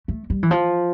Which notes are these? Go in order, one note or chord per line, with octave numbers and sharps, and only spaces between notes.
A3
G3
E3
F3